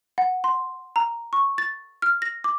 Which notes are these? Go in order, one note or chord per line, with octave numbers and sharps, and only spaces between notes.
F#5
C6
A#5
C#6
A6
F6
A#6
D6